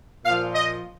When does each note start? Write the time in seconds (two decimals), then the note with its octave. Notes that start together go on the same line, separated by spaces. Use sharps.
0.25 A#2 F3 F5
0.54 D#5